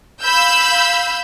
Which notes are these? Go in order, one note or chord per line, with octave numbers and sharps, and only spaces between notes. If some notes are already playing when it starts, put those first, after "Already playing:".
F5 B5 E6 G6